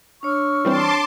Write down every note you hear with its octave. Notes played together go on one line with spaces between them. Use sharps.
D4 C#5 C#6 E6 F6
E3 G3 C4 A5 C6 D6